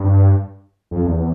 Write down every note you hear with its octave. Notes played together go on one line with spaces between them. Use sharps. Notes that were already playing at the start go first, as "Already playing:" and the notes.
Already playing: G2
F2
E2